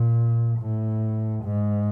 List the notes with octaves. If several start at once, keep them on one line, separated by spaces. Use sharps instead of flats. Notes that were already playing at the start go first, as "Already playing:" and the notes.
Already playing: A#2
A2
G#2